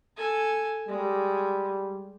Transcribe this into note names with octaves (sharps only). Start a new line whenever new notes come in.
A4 G#5
G3 G#3